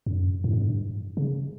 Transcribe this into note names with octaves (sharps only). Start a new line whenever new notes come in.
F#2
A2
G#2
G2
C#3